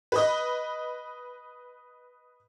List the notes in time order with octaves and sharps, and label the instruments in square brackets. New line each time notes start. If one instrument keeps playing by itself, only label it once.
[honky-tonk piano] B4 D#5